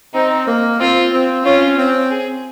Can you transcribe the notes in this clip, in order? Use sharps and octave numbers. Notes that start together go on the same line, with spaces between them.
C4 D#4
A#3
C4 F4
C4
C#4 F4
C4
G#4